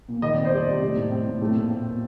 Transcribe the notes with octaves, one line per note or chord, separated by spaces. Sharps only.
A#2
D#3 D#5
C4 D5
C5
G3 D5
C3
A3
A2
C4
A2
A3
A#2
C4
A#2